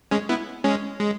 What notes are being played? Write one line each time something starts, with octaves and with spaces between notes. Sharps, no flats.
G#3 C#4
B3 E4
G#3 C#4
G#3